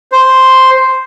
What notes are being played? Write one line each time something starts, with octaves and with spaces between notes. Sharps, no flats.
C5